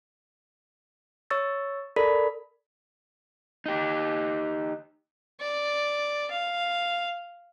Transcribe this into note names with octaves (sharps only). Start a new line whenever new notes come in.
C#5 C#6 E6 A6
A4 A#4 D5 B5 B6
D#4 G4
D5
F5